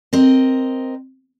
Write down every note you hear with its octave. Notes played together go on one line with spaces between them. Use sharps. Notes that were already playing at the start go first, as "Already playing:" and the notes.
C4 A#4 D#5